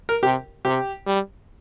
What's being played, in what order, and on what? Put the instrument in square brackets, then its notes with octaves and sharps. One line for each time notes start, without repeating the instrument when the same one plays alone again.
[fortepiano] A#4
[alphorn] C3 [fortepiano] G4
[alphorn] C3 [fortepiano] G4
[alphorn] G3